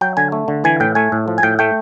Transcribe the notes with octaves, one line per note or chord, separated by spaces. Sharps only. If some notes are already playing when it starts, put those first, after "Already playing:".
F#3 G5
D3 G#5
A3
D3
E3 G#5
A2 G5
A3 G#5
A2
F3
G#5
A2 G5
A3 G5